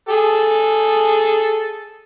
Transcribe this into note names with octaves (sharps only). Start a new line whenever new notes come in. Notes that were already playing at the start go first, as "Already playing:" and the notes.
G#4 A4